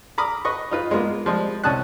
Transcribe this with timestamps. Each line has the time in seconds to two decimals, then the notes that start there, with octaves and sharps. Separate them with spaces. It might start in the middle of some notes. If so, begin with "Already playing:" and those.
0.18 A#5 B5 D6 D#6 F6
0.45 B4 D#5 C#6
0.71 D#4 F4 B4
0.91 G#3 A#3 B3 F4
1.26 F3 G3 G#3
1.64 C2 C#4 A5 D#6 F#6